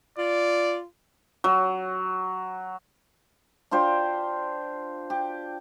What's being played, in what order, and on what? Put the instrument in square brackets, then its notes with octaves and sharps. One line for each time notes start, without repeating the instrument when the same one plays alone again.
[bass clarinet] F4 [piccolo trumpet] D5
[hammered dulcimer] F#3
D4 F4 G4 C5
G4